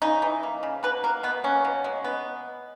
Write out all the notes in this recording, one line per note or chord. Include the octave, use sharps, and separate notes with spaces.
C#3 D#4
E3
A#3
C#3
B2 B4
A#3 A#4
B2 B3
A#3 C#4
B2
G#3
B3